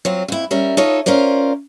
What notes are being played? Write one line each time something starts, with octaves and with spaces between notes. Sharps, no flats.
F#3 C4 F4
F2 E4
G3 C#4 A#4 E5
D#4 F4 A4 C#5 D#5
C#4 F4 A#4 C5 D5